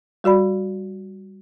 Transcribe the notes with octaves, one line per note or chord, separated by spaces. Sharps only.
G3 F#4 D5 B5